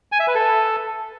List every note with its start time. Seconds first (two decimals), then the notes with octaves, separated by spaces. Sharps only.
0.12 G#5
0.20 E5
0.27 B4
0.35 A4